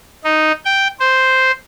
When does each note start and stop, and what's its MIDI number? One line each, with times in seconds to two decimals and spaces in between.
0.24 0.52 63
0.65 0.88 79
1.00 1.51 72